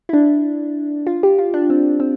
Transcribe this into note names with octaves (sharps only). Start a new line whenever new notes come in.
E4
D4
F4
G4
F4
D4
C4
C4